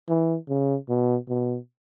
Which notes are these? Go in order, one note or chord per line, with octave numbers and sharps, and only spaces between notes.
E3
C#3
B2
B2